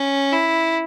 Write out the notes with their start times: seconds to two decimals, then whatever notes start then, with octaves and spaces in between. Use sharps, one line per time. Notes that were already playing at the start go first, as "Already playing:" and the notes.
Already playing: C#4
0.32 E4